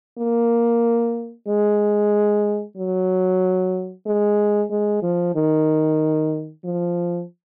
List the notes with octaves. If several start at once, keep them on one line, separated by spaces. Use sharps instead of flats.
A#3
G#3
F#3
G#3
G#3
F3
D#3
F3